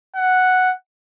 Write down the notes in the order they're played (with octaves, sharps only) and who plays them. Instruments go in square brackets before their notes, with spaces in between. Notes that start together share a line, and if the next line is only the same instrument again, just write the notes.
[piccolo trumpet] F#5